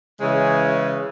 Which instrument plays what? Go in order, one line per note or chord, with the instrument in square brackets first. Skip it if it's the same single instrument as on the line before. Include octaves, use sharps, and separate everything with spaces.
[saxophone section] C#3 E3 G#3 C#5